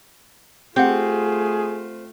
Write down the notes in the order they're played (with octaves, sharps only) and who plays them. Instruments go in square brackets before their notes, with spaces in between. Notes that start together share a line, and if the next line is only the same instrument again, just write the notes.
[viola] A3 F4 [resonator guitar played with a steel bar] C4 [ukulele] G4 F#5 [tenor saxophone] G#4